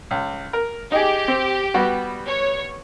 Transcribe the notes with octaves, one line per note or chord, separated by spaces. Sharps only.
C#2
A#4
D#4 G4 G#4
C4
G3 B3 F#4
C#5